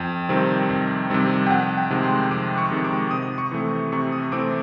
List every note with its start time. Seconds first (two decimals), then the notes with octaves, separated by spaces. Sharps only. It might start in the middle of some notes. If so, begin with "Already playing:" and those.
Already playing: F2 G5
0.29 C3 D#3 G3 C4
0.70 F2
1.10 C3 D#3 G3 C4
1.47 G5
1.50 F2 F#5
1.78 G5
1.90 C3 D#3 G#3
2.03 C6
2.31 F2 D6
2.58 C#6
2.71 C3 D#3 G#3
2.84 D6
3.11 C3 D#6
3.38 C#6
3.51 E3 A3 C4
3.92 C3 C#6
4.12 D#6
4.32 E3 A3 C4 D6